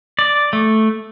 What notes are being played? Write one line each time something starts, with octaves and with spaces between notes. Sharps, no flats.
D5
A3